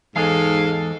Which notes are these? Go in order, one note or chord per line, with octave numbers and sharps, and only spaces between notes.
E2 G#2 G#3 G#4 A4 F5